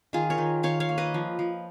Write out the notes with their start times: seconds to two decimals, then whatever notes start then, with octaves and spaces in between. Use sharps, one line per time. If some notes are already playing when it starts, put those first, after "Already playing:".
0.13 D#3 F4 G#4
0.30 A#4 C#5
0.38 D#3
0.63 D#3 C#5 F5
0.80 C#5 F5
0.89 A#3
0.98 B4 D#5
1.14 F3
1.39 F3